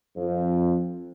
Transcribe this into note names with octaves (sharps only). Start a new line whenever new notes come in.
F2